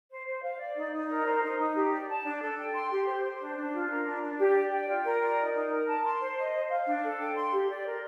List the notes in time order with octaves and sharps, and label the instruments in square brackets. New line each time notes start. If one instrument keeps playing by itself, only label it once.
[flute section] C5
C5
F5
D5
D#4
D#4
A#4
C5
D#4
D#4
G4
D5
A5
D4
A4
G5
C6
G4
C5
C5
D4
D4
F4
A#4
D4
D4
G4
D5
G5
F4
A#4
D5
D#4
D#4
A#4
A5
C6
C5
D#5
C5
F5
D4
A4
G5
C6
G4
D5
A#4